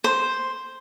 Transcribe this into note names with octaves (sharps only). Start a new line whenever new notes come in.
C5